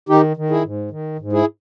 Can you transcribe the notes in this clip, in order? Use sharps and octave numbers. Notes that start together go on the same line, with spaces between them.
D#3 D#4 G4
D#3
E4 G#4
G#2
D#3
G#2
E4 G#4